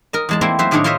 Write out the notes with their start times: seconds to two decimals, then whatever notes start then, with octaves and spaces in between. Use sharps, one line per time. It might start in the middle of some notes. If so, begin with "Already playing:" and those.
0.13 A#4 D#5
0.29 E2 G#3 A5
0.41 A3 A#3 C4 E4 C5 G5
0.59 F#3 C5 E5
0.71 A2 D#3 A#3 D4 G#4 C#5
0.84 F4 A#4 C5 C#5 D#5 E5